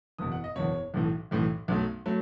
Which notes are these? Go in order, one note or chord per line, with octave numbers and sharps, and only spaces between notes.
F#1 E2 B2 D#6
F#5
D#5
F#1 E2 B2 C#5
B1 A2 E3
B1 A2 E3
B1 B2 F#3 A3
F#3 A3